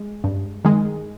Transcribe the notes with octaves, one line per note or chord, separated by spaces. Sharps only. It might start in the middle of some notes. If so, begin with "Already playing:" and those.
Already playing: G#3
G2
D#3 G#3